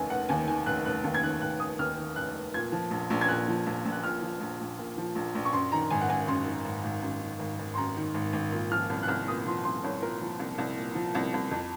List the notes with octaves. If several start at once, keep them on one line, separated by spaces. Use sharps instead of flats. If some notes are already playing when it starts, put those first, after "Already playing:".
Already playing: F1 D#2 D#3 G#5
F1 F#5
D#2 G#5
D#3 G#5
F1 F#6
F1 F#6
D#2
G#6
D#3 F#6
F1 F#6
F1 D#6
D#2 F6
D#3
F1 F#6
F1
A#2 G#6
F3
A#1
A#1
G#6
A#2 F#6
F3
A#1
A#1
F#6
A#2 F6
F3
A#1
A#1
A#2
F3
A#1
A#1
C#6
F#2 C6
D#3 A#5
G#1 G#5
F#5
G#1 G#5
F#2 C6
D#3
G#1
G#1
F#2
D#3
G#1
G#1
C6
F#2 A#5
D#3
G#1
G#1
A#2
F3 F6
C2
F#6
C2 F6
A#2 D#6
F3 C6
C2 C6
C2 C#5
A#2 A#4
F3
C2
C2
A#2
F3
C2
C2
F2